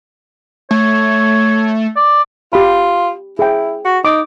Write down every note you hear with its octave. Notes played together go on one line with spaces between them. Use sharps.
A3 C#5
D5
F4 G4 B5
E4 G#4 G5
F#4
D#4 D6